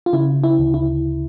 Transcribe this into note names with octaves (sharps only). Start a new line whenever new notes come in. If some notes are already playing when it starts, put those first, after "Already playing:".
F4
C#3 E4
E4
D2
E4